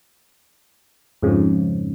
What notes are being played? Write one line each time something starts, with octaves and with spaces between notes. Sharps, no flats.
F2 G#2 C#3